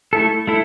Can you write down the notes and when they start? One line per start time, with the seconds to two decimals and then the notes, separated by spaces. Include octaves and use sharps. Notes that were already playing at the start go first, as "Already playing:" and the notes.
0.13 A3 E4 A4
0.47 A3 E4 A4